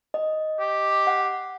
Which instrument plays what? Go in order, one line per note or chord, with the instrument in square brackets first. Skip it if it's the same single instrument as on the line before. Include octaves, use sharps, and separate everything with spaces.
[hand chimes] D#5
[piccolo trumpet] G4
[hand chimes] F#5